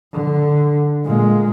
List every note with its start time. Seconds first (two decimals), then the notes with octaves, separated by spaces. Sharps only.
0.13 D3
1.05 A#2 G#3